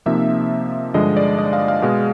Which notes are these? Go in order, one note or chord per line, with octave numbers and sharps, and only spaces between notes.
C3 F3 A#3 D#4 E5
G2 D3 F3 G#3 D#5
D5
D#5
F5
F5
B2 G#3 B3